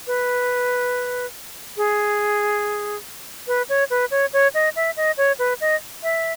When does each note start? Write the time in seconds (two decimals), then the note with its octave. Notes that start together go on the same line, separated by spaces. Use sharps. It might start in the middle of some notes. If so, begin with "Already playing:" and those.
0.07 B4
1.77 G#4
3.47 B4
3.69 C#5
3.90 B4
4.11 C#5
4.33 C#5
4.54 D#5
4.76 E5
4.97 D#5
5.17 C#5
5.39 B4
5.61 D#5
6.03 E5